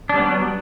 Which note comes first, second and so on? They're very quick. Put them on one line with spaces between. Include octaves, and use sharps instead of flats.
D4 G3 B3 F#3